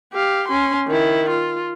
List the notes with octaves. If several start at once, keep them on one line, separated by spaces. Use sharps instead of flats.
G4 F5
C#4 C6
D#3 E4
F4